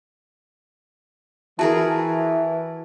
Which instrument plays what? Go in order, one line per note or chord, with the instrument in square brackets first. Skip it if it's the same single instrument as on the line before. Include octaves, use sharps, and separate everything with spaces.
[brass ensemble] E3 [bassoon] E4 [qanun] F#4 G#4 A#4 [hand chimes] A5